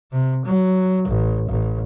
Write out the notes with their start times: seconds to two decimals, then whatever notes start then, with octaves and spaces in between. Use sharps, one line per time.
0.12 C3
0.45 F#3
1.08 A1
1.49 A1